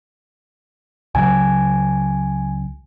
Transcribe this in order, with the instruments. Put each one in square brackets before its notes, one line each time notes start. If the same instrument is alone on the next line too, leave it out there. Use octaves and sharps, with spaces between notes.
[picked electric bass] C#2 C#3 F#3 [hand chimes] G#5